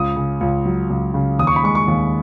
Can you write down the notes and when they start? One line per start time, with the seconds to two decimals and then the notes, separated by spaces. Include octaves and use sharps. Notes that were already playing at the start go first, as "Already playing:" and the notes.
Already playing: C#2 D#6
0.16 C#3
0.41 C#2
0.65 F#3
0.90 C#2
1.14 C#3
1.39 D#2 D#6
1.47 C#6
1.56 B5
1.63 G#3 C#6
1.75 C#6
1.88 D#2